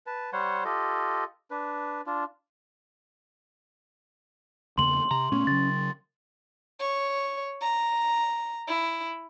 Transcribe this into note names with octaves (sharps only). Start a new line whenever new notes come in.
B4 A5
G3 C5 C#5 F#5
F4 G4 A4 D#5
D4 B4
D4 F4
E2 C#3 A#3 C6 F#7
C3 A#5
A#2 A3 B3 C#4
C#3 F#3 A6
C#5
A#5
E4